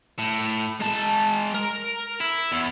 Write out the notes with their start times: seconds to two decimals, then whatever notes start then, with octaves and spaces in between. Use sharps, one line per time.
0.18 A2
0.80 G#3 A5
1.55 A#4
2.20 E4
2.52 E2